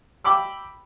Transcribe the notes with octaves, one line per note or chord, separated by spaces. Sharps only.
G5 B5 D6 E6